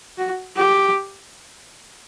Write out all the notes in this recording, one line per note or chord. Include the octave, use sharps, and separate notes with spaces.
F#4
G4